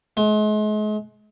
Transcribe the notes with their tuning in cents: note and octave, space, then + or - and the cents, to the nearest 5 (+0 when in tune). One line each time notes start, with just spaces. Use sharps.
G#3 +40